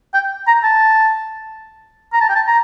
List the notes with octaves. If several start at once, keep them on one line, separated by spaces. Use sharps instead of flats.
G5
A#5
A5
A#5
A5
G5
A5
A#5